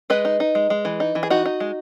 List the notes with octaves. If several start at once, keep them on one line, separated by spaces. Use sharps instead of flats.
G#3 B4 D#5
D#4
D#4
G#3
G#3
E3
D#4
E3
G#4
D#4 F#4
D#4
G#3